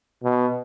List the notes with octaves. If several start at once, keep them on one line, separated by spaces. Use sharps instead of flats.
B2